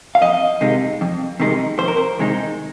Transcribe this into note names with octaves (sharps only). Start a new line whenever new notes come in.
F5
F2 D#5
C3 D#3 G#3 D#4
F2
C3 D#3 G#3 D#4
F2 C5
A#4
C5
C3 D#3 G#3 D#4